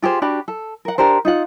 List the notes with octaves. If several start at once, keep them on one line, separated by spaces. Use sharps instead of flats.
F4 G4 G#4 C5
D4 F#4 G4 B5
A4
A#4 F#5
D4 G4 A#4 C5
D#4 F4 F#5